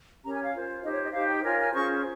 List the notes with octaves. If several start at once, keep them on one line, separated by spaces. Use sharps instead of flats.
C#4 G4 A#4 C#5 A#5
G#5
F5
F4 C5
D#4 G4 C5 D#5
C#5
D#5
D#4 G4 C5 F5
G5
F4 A#4 C#5 G#5
G#5
C#4 F4 G#4 C5 C#6